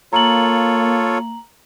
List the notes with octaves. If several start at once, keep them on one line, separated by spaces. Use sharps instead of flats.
A#3 F4 A4 C#5 A#5 F#7